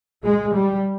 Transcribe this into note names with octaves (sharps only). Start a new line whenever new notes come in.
G#3
G3